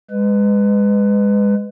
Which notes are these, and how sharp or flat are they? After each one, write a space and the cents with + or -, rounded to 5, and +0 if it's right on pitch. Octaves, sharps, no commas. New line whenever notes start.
G#3 -20 B4 +20